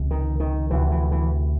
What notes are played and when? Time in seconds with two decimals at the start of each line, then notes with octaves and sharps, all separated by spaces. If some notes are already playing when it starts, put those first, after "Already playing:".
Already playing: C#2 C3
0.11 D#3
0.40 D#3
0.70 D2 C3 E3
0.91 E3
1.12 E3